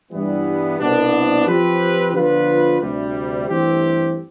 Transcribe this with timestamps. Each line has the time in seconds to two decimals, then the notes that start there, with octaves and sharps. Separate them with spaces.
0.12 G2 E3 G3 B3
0.79 C2 B2 B3 D4
1.46 F3 C4 G4 B4
2.13 D3 F3 B3 F4 B4
2.80 D2 C3 G3
3.48 G2 E3 A3 C4 G4